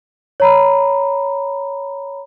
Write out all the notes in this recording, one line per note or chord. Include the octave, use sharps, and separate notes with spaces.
C#5 A#5 B5